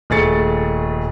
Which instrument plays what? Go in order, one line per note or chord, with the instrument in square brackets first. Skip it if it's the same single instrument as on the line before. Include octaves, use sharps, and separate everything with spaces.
[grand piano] D#1 A3 G#4 A6 C#7